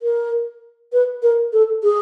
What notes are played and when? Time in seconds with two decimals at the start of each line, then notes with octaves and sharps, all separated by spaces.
0.02 A#4
0.93 B4
1.23 A#4
1.53 A4
1.83 G#4